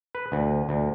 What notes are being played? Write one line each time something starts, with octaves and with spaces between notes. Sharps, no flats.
B4
D2
D2